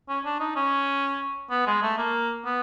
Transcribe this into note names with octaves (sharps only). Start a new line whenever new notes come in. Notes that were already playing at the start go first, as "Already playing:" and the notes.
C#4
D4
D#4
C#4
B3
G#3
A3
A#3
B3